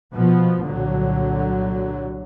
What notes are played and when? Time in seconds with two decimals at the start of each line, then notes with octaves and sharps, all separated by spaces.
0.15 B2 F3 B3
0.64 C2 A#2 D3 F#3